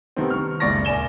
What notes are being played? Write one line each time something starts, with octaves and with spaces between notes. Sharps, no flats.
C3 D#3 G3 A3 B3 C4
C#6 F6
F#1 C#2 D5 C#6 A6 A#6
D#1 D5 G#5 E7 G7